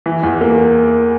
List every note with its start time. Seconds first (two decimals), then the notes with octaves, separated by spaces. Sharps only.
0.06 E3
0.23 E2
0.41 A#3